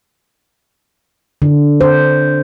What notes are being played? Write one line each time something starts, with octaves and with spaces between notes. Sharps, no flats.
D3
C5